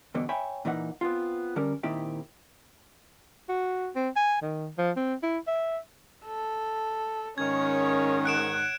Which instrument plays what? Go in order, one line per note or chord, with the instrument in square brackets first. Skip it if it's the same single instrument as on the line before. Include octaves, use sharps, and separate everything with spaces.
[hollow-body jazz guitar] E2 G2 B2 D3 B3
C#5 E5 G5 G#5 B5
A#2 E3 D#4 C#5 F#5
B3 C4 F4
D3 G3 C#4 A#4
A#2 D#3 C4 E4 G4
[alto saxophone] F#4
C4
G#5
D#3
F3
C4
E4
E5
[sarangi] A4
[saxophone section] G#2 D#3 [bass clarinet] C#4 [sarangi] C#5 [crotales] G#6
[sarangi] F#5 [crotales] F#6 D7 E7